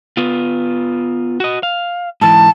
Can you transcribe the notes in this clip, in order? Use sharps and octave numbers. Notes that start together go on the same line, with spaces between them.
B3 F4
F#4 D#5
F5
G#2 E3 A5